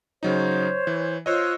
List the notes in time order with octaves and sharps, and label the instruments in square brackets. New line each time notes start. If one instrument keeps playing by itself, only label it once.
[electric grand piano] C#3 F#3 D#4 [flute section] C5 C#5
[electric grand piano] E3
[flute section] F4 E6 F#6 [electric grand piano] C5 C#5 D#5